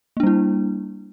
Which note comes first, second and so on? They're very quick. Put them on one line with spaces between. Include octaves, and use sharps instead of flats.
A#3 D4 G3 E4